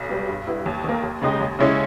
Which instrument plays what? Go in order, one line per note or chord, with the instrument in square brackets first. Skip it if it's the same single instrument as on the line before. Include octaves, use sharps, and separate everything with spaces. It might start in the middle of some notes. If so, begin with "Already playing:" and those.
Already playing: [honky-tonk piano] B1
B2 G3
G2
G3 B3 E4
D#2
D#3 A#3
D#2
C#3 G#3 D#4 G4
D#2
C#3 G#3 C#4 E4